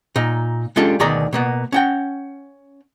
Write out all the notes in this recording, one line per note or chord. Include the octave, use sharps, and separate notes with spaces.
A#2 D#4
G#3 C#4 D4 F4 G4 A4
D2 B2 D#3 G#4 D5 A#5
B2 A#3 B3
C#4 F#5 G5